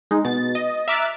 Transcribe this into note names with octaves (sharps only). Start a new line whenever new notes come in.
G#3 D#4
B2 A6
D#5
E5 A#5 D6 F6 F#6 A6